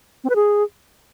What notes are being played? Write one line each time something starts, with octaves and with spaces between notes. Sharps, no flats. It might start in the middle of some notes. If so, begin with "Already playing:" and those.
C4
B4
G#4